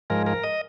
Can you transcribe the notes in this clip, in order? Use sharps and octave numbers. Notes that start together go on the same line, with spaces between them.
G#2 F3 G#3 A#4
A#4
D#5